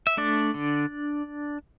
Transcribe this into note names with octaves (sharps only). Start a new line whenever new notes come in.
E5
A3 D4 D5
D3